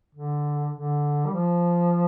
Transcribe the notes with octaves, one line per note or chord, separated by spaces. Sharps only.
D3
D3
G3
F3